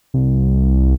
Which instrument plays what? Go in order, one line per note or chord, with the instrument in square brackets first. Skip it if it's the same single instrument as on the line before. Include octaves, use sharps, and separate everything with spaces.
[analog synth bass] C2